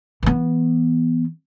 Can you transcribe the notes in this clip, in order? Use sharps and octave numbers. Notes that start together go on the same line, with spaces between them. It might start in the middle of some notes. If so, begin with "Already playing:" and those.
E3 B3